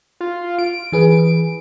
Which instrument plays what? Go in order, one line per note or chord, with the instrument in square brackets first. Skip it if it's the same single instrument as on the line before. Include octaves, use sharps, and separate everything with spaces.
[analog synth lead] F4
D7
[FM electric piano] E3 G#4 B4